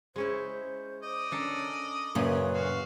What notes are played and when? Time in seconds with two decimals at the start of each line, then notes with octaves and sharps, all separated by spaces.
0.16 G#3 C#4 E4 C5
1.03 D5 D#5
1.32 C#4 D4 A4 A#4
2.15 F#2 A#2 C#3 B4
2.54 F#4 F5